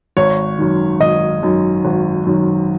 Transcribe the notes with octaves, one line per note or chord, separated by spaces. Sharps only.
G#1 C#5
F#2 D#3
G#1 D#5
F#2 D#3
G#1
F#2 D#3